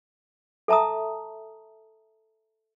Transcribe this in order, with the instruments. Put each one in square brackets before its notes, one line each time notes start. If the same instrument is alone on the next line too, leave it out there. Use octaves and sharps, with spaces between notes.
[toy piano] A4 E5 A5 A#5 D#6